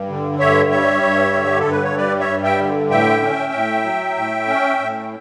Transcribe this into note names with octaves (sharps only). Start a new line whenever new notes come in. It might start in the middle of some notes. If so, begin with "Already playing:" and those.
Already playing: G2
D3
G2 C#5 E5
G3 C#5 E5
G2
D3
G4
A4
G2
B4
C#5
G3 B4 D5
C#5 E5
G2
E5 G5
D3
A2 E5 G5
C#4
A2
F#3
A2
C#4
A2